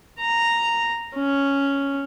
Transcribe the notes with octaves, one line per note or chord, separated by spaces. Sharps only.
A#5
C#4